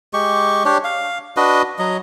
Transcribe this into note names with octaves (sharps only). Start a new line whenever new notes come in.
G#3 G4 C#6
D4 G4 C#5
F5
D4 F#4 B4 D#5
F#3 D#5